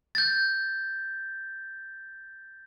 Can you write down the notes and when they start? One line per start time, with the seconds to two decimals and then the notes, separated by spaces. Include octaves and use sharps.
0.15 G6 A6